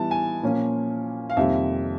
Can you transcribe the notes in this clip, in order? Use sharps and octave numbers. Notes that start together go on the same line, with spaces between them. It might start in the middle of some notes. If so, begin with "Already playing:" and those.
Already playing: E3 G3 B3 E4 A5
G#5
A#2 F3 A#3 C#4 F4
F5
F2 C3 D#3 G3 A#3 E5